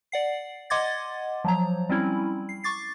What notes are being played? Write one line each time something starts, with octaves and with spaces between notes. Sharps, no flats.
D5 F#5 C7
D#5 F#5 C6 D6 G#6 A6
F3 F#3 A#5
G3 C4 C#4 E4
C7
C#6 D6 A6 C7